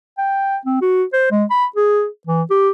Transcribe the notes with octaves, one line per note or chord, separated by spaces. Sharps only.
G5
C4
F#4
C5
G#3
B5
G#4
E3
G4